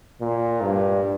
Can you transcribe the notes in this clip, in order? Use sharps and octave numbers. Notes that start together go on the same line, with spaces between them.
A#2
G2